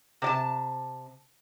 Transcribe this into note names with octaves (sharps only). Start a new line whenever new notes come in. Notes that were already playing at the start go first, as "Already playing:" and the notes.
C3 D5 A5